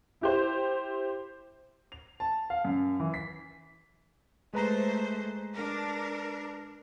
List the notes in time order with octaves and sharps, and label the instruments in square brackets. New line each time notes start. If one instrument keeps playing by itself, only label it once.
[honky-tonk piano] E4 G4 C5
[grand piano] F7
A5
F5
F#2
E3
B6
[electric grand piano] G#3 B4 A#5 [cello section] A3 C5
[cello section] D4 A#4